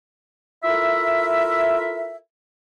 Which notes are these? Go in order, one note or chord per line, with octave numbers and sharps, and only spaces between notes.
E4 F4 A4 A#4 E5